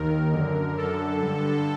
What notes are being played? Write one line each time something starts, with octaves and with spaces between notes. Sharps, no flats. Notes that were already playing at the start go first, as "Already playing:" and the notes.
Already playing: D#2 D#3 A#4
F#2 D3
F#2 D3 A4
G2 D3